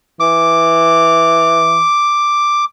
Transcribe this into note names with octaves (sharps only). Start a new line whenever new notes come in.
E3 D6